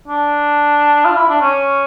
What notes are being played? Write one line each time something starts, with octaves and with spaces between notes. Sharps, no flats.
D4
F4
E4
D4
C#4